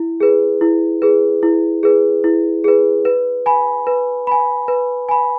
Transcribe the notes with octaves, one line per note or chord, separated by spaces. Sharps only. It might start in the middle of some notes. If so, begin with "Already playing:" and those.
Already playing: E4
G#4 B4
E4
G#4 B4
E4
G#4 B4
E4
G#4 B4
B4
G#5 B5
B4
G#5 B5
B4
G#5 B5